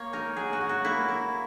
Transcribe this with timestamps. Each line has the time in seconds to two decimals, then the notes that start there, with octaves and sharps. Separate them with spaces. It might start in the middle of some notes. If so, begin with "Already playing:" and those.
Already playing: A#3 C#5
0.13 D#4 A#4
0.36 F#3 G#4
0.53 F#4
0.61 F#3
0.69 F#4
0.85 A#3 E4
1.08 E4